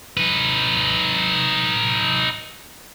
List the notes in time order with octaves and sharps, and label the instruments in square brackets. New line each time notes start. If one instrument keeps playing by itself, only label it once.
[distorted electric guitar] D#4 B4